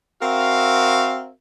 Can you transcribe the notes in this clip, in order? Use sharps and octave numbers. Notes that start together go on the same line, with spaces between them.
C4 F#4 A#4 E5 F5